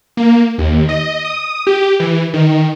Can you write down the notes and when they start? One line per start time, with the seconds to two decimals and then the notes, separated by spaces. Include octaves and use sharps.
0.17 A#3
0.58 D#2
0.89 D#5
1.25 D#6
1.67 G4
2.00 E3
2.34 D#3